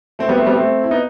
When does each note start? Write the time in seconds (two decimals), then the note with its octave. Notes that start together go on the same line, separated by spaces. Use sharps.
0.19 A3 C4
0.29 G3 B3
0.38 A3 C4
0.46 G3 B3
0.55 A3 C4
0.84 E4
0.91 B3 D#4